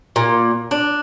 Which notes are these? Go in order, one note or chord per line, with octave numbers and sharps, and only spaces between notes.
A#2
D4